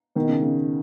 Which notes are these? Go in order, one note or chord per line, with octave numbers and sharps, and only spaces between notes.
B2 D#3
C#3
C#3